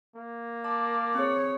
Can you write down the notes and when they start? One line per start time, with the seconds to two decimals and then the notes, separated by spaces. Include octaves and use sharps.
0.15 A#3
0.64 D5 A5
1.15 C4 G#4 C#5